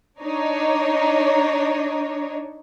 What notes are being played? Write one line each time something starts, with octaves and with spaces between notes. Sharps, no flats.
D4 D#4 C#5